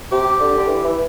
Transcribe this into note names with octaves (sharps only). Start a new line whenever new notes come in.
C3 G4
D3
D3
E3
E3